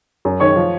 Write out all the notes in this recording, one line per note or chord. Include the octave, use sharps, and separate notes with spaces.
F#2
D#3 C#5 C#6
F3